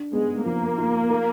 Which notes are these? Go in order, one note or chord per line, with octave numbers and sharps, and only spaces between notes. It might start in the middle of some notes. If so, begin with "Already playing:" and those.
Already playing: D4
G#3 B3
F3 A#3
F4
A#4